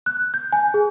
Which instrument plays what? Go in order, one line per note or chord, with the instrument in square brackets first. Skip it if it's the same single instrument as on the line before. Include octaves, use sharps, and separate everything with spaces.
[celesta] F#6
G6
G#5
G#4